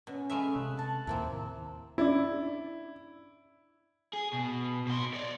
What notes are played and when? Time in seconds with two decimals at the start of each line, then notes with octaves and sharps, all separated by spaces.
0.07 B2 C#4
0.30 G#3 A3 E5 F5 B5
0.56 C3 F#6
0.77 A4 A5
1.07 D#2 A2 C3 D#3 A#3 C4 E4
1.98 C#4 D4 E4 D5
4.13 G#4
4.33 B2
4.87 B2 C6
5.14 C#5 D5